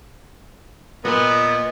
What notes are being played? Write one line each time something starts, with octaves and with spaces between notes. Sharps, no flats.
A#2 B3 D#5